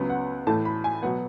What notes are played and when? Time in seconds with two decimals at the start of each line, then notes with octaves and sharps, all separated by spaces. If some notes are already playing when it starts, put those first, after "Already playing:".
Already playing: C#2 C#3 F#3 B3
0.10 F#5
0.47 A2 E3 A3 A5
0.65 B5
0.84 G#5
1.03 B2 F#3 B3 F#5